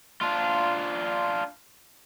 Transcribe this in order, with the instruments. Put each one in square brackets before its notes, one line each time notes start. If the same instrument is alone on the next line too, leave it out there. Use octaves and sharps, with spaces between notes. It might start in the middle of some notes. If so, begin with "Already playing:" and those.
[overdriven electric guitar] D4 F4